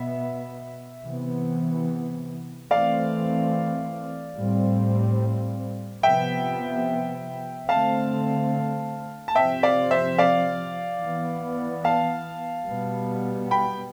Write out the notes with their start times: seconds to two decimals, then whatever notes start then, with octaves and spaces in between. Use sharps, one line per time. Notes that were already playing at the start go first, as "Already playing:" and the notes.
Already playing: B2 B3 E5
1.05 C3 E3 B3
2.71 E3 A3 C4 D5 F5
4.38 A2 G3 C4
6.03 C3 F3 B3 E5 G5
7.69 D3 A3 C4 F5 A5
9.28 A5
9.35 C3 F3 C4 E5 G5
9.63 D5 F5
9.91 C5 E5
10.18 D5 F5
11.02 E3 B3
11.84 F5 A5
12.68 B2 G3 B3
13.51 G5 B5